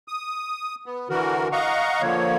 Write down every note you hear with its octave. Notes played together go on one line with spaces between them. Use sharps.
D#6
B3
D3 E3 F#4 A#4
D#5 F5 F#5 A#5 C#6
D3 F3 A#3 C#5